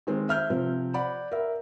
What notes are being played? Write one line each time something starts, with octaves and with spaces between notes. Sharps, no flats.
D#3 G#3 C4
E5 F6 G6
C3 F3 C4
D5 F#5 B5
A#4 E5